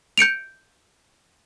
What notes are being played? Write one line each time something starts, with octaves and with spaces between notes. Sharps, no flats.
G6 C#7 D7 F7